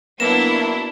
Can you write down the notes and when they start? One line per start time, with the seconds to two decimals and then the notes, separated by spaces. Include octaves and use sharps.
0.20 F#3 A#3 B3 D4 E4 B4 A#6 E7